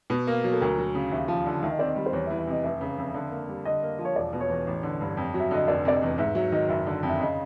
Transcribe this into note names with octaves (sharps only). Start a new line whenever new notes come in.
B2
A#3
F#3
A4
D2 A#4
F#3
C#3
D#2 E5
F3
D3
D#3 E5
D#5
C4 D5
D#5
G3
C5
E2 C#5
E5
E3
E5
C3 D#5
F1 E5
C#3
F2
D3
A#3
G3
D3 D#5
A#3
F3
C#5
E1 D5
B2
C#5
E2
A1
D3
G2
F2
F#3
E5
D3 D#5
F1 D5
C3 D5
D#5
E2
G#2 E5
F#3 E5
D#3 D#5
F#1 E5
D3
F2
E5
C#3 D#5